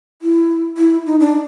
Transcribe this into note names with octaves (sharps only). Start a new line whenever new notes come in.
E4
E4
D#4
D4